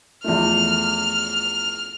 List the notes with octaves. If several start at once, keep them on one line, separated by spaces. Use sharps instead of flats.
E2 F3 A3 F6